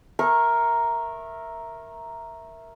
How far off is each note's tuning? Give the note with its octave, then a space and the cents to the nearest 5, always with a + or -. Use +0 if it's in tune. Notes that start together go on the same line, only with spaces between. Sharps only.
A#4 +0 E5 +0 C#6 -25